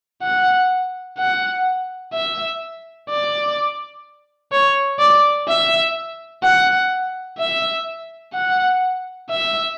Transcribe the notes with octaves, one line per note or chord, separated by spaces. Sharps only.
F#5
F#5
E5
D5
C#5
D5
E5
F#5
E5
F#5
E5